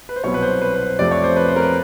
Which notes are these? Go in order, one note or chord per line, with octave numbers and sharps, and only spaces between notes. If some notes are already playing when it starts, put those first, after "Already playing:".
B4
C5
C2 B2 F#3 B3 C#5
B4
C5
B4
B4
C5
F2 C3 F3 A3 D5
C#5
C5
B4
C5
A#4
B4